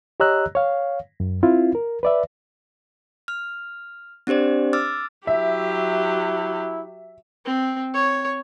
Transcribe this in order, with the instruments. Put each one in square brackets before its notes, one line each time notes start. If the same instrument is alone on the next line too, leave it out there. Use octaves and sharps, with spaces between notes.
[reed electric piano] G4 C#5 D#5 A#5 E6 F#6
C#5 F5
F#2
C4 E4 F4
A#4
B4 D5 E5
[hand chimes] F6
C4 D4 G4 C5 D5
D6 E6 F6 A6
[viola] F#3 G4 [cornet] E4 [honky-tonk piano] E5
[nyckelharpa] C4
C#5